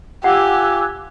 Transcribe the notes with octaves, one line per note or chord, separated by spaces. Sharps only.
F4 G4 F#5 G#5 D6 E6 F#6